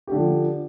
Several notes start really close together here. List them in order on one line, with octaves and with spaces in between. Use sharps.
G4 D3 F3